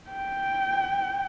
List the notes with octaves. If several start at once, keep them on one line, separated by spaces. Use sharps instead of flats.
G5